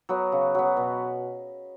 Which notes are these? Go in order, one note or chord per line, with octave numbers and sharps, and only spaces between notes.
F#3 B3
C#3
F#3 B3
B2